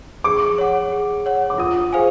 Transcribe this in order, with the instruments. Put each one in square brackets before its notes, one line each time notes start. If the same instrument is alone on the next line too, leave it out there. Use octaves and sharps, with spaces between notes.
[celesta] G#4 [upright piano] D6
[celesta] C#5 F#5
G#4
C#5 F#5
[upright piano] D6
[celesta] F4 [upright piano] D#6
[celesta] G#4 C5 F5 G#5